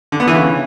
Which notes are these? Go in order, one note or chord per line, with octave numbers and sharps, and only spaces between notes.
D3
B3
E3
C#3